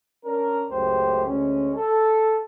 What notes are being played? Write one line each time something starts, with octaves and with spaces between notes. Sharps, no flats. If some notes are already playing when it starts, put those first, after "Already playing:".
C#4 D4 A#4
C#2 F#2 A3 G4 C5
D2 G#3 C#4
A4